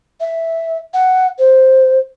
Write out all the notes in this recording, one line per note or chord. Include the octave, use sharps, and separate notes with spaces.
E5
F#5
C5